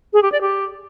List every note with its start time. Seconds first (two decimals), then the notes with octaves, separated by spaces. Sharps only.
0.13 G#4
0.23 G4
0.32 D5
0.41 G4